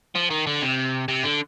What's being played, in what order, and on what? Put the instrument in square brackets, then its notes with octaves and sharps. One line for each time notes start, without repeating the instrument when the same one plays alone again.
[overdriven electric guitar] F3
D#3
D3
C3
C3
D3